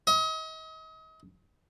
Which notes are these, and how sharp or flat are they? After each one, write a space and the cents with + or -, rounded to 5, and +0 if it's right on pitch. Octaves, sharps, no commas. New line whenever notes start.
D#5 +35